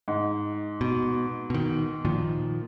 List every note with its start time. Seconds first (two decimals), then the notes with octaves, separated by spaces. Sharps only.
0.08 G#2
0.81 B2
1.50 B2 D#3
2.05 A#2 D#3 F3